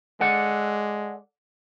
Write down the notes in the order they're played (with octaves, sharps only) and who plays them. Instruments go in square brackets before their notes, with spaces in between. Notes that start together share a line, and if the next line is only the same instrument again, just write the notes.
[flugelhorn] G#3 [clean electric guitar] A4 D5 F#5